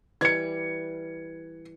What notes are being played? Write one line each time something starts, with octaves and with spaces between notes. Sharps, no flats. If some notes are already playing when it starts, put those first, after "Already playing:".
E3 G3 D6 G#6 C#7